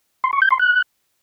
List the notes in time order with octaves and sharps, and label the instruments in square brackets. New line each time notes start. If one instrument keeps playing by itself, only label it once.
[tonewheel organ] C6
C#6
G6
C6
F#6